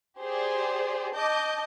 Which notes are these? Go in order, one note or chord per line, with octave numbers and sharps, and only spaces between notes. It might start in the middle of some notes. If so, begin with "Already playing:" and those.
G4 G#4 C5 D5
D#5 A5 D6 G6